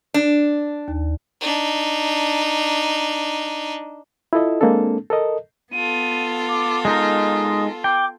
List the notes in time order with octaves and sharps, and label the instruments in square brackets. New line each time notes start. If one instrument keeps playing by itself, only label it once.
[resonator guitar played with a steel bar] D4
[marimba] D#2
[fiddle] D4 D#4
[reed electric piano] E4 F4 A4 D#5
G#3 A#3 C4 D4 A4
A4 A#4 D#5
[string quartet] B3 F4 A4 [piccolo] D#7
[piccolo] D6
[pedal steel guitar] G#3 D#4 A#4 [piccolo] D#6
[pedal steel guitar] G5 [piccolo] D6